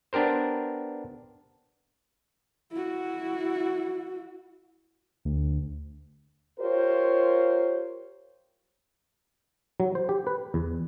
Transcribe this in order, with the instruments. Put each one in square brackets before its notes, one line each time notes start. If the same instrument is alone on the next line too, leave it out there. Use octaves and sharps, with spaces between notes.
[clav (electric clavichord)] B3 D4 G4 A#4 C5
[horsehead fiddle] E4 F#4
[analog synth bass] D2
[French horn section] F4 G4 A#4 C5 C#5
[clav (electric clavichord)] F#3
C5
G4
B4
E2